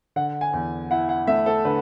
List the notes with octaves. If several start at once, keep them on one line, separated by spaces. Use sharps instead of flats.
D3 F#5
G#5
E2
E4 F#5
F#5
A3 E5
A4
D3 B4